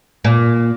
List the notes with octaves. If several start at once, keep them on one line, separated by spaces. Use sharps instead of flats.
A#2